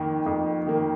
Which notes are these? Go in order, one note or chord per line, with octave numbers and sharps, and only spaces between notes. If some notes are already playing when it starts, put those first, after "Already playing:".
Already playing: F2 D#3 A#3
F2
D#3 A#3